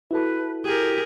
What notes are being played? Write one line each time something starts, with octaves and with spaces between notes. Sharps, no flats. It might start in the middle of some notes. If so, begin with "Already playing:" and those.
E4 F#4 A4 B4
G4 G#4 A#4